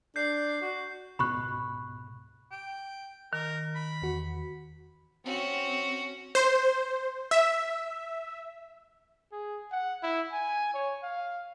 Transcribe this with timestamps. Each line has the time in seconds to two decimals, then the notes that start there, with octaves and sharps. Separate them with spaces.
0.16 D4 G6 C7
0.61 F#4
1.19 C#2 G#2 B2 B5 C#6 F#6
2.51 G5
3.33 D#3 A#4
3.75 B5
4.02 E2 F#4
5.25 C4 C#4 F#4
6.35 C5
7.31 E5
9.32 G#4
9.72 F#5
10.03 E4
10.32 G#5
10.74 C#5
11.03 F5